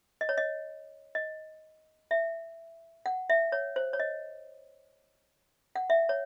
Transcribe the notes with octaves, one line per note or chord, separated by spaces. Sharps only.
D#5
C#5
D#5
D#5
E5
F#5
E5
C#5
C5
C#5
D#5
F#5
E5
C#5